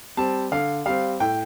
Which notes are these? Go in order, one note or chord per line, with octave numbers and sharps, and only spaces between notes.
G3 C4 A5
D3 F5
G3 C4 F5
A2 G5